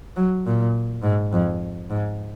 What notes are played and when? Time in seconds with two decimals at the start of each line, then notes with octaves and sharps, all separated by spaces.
0.16 F#3
0.46 A#2
1.03 G#2
1.32 F2
1.90 G#2